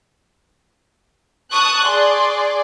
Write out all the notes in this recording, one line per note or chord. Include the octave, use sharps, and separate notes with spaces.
A5 C#6 D#6 F#6
G#4 D5 C6